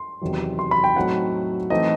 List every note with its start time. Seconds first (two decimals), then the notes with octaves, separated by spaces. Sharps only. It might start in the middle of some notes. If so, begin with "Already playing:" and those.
Already playing: C6
0.21 E2 C3 D#3 F#3
0.59 C6
0.71 B5
0.84 G5
0.96 A2 F#3 A3 C4 D#4 F#5
1.70 E3 A3 C4 D#4 D#5